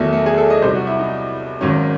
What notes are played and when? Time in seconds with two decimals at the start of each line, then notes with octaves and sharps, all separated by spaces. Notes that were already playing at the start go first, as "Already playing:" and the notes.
Already playing: E2 D#3 F#3 A3
0.13 A3
0.26 G#4
0.38 A4
0.50 D#5
0.62 C2 C5
0.65 C3 F#3
0.76 F#4
0.87 E4
0.99 D#4
1.61 G#1 G#2 D#3 F#3 C#4